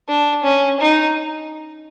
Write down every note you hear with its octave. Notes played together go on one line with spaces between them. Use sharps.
D4
C#4
D#4